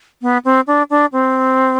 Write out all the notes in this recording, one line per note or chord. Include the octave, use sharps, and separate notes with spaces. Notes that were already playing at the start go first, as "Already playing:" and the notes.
B3
C4
D4
D4
C4